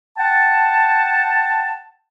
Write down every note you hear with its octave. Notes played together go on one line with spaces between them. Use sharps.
F#5 G5 A5